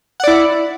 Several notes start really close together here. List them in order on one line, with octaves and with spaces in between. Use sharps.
F#5 D5 E4